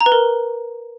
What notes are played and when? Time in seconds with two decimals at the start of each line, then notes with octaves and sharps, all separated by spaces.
0.01 A#5
0.06 B4
0.12 A#4